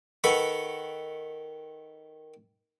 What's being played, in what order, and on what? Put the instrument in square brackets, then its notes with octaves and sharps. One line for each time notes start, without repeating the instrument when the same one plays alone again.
[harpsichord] D#3 A4 B4 F#5 B5 C#6